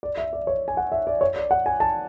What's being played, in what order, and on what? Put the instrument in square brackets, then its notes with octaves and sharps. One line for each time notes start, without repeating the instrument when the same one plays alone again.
[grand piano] D5
E5
D5
C#5
G#5
F#5
E5
D5
C#5
D5
F#5
G#5
A5